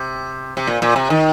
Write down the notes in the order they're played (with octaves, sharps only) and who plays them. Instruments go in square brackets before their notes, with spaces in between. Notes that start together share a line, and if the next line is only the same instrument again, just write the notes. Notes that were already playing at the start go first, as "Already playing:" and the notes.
Already playing: [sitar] C3
C3
A#2
A#2
C3
D#3